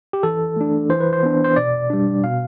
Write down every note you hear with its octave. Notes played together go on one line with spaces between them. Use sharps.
G4
E3 A4
A3 D4
E3 C5
B4
C5
B3 D4
C5
B2 D5
G3 D4
B2 F5